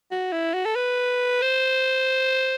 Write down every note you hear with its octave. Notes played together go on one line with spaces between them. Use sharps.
F#4
E4
F#4
A4
B4
C5